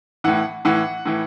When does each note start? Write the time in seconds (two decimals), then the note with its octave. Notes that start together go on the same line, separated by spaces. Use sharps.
0.24 A2 E3 F#5
0.65 A2 E3 F#5
1.06 A2 E3